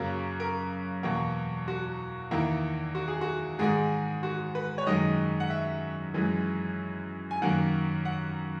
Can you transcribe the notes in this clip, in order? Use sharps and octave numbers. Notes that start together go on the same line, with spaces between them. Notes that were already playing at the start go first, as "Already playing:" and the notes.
Already playing: F#2 C#3 F#3 A#3 A#4
A#4
E2 B2 A#3
F#4
E2 D#3 A#3 E4
F#4
G#4
F#4
G#2 D#3 G#3 G#4
F#4
B4
C#5
F#2 D#3 G#3 D#5
F#5
E5
F#2 E3 G#3
G#5
F#2 D#3 A#3 F#5
F#5